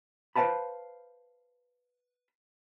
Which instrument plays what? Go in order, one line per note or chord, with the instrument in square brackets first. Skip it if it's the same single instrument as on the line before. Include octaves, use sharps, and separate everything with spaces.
[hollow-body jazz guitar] B4 C5 D#5 F5 A5 B5